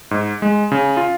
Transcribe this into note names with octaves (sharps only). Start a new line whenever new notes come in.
G#2
G#3
C#3
F4